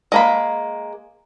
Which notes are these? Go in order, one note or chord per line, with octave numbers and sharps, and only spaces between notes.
G#3 A#3 B5